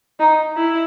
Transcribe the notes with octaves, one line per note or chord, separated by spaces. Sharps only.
D#4
E4